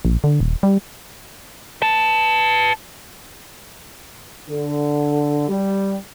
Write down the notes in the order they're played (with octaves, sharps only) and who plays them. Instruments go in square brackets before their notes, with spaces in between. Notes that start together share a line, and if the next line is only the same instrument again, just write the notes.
[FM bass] A#1
D3
D#1
G3
[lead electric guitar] B4 A5
[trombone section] D3
G3